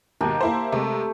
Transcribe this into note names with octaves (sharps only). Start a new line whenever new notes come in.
D#2 G#2 B2 G4 A#4 A5
A#3 E4 C5
C3 G#3 A3